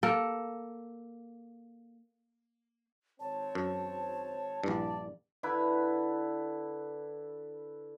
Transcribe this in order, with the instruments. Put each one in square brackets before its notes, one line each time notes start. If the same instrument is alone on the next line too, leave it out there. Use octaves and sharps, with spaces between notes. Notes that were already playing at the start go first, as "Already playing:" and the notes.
[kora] A#3 A4
[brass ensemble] G#1 C4 C#5 [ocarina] A5
[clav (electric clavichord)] F#2
[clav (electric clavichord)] A#1 G2 [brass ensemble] E4 D5
[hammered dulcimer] D3 E4 B4